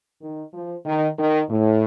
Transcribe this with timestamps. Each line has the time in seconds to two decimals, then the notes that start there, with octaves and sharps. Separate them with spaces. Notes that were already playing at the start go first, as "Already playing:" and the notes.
0.21 D#3
0.54 F3
0.86 D#3
1.18 D#3
1.50 A2